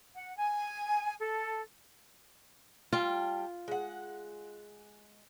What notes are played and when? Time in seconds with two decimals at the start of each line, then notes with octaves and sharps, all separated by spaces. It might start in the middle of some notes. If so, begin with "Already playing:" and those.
0.15 F#5
0.37 G#5
1.20 A4
2.93 G3 F4 G5 A5
3.68 G#3 F#5